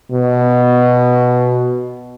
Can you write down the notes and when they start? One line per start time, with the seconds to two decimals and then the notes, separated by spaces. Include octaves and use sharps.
0.11 B2